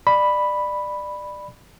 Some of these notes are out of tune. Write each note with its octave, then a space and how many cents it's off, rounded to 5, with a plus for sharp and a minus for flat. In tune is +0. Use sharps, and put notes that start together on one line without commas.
D5 +25 B5 +0